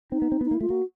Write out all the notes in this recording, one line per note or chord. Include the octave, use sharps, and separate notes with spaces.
C4 D#4
B3
C4
B3
D#4
A#3
E4
A3 F4
A#3 F#4